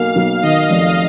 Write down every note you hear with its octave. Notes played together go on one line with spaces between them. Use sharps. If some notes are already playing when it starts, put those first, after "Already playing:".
Already playing: B1 A#3 F5
B1
D#3 D#5
F1